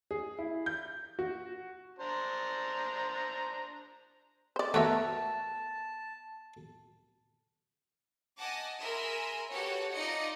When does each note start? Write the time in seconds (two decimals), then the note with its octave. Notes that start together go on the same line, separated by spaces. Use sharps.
0.11 G#4
0.39 E4
0.66 G6
1.19 F#4
1.99 D4 C5 A#5
4.56 C5 D5
4.74 A3 B3 F#4 A#4 C#5 E5 A5
8.39 D#5 F#5 G#5 A5 D6
8.79 G#4 A#4 E5 B5 C6
9.51 F#4 G4 A4 B4 C#5 F#5
9.93 D#4 F4 D5 D#5 C#7